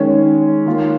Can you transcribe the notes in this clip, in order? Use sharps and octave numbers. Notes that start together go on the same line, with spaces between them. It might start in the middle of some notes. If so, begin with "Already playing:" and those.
Already playing: D#3 G#3 C#4
D#3 A#3 F4